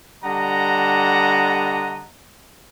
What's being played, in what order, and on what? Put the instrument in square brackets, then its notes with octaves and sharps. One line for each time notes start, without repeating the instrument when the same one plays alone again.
[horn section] D3 G3 D#5 F#5 A5 A#5